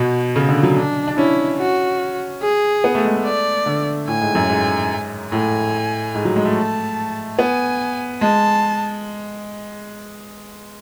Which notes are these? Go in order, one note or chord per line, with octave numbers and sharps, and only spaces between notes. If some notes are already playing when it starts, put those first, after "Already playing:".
Already playing: B2 F#4
C#3
D3
F#3
D4
D4
C#4 E4
F#4
G#4
B3
A3
G#3
A3
D5
D3
A2 G#5
G#2
F#2
G#2
A2 G#5
G#2
F#3
G#3
A3
A5
B3 G#5
G#3 A5